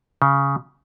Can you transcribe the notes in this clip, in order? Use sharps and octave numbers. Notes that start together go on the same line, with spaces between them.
C#3